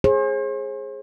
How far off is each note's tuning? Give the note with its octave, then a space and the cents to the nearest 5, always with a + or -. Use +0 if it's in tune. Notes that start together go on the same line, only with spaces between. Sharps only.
G#4 +0 C5 +45